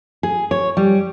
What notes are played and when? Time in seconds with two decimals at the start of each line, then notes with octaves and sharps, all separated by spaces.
0.23 G#4
0.51 C#5
0.77 G3